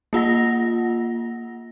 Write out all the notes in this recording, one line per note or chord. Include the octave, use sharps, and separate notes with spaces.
A#3 F4 F#5 A#6